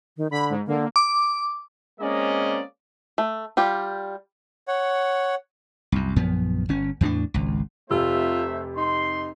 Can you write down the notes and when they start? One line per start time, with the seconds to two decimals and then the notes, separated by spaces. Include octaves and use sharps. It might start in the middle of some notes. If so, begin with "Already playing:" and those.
0.17 D#3
0.31 D3 B5
0.50 G#2
0.67 D3 A#3
0.96 D6
2.01 G#3 A#3 C4 C#4 D5 D#5
3.18 A3
3.57 G3 F4 G4
4.68 C#5 F#5
5.92 C2 F#2
6.16 A#1 F#2 F3 B3
6.69 G1 C#4
7.01 E2 A2 C4 D4
7.34 G#1 C#2
7.90 F1 C3 A3 F4 C5 E5 E6
8.77 D#4 C6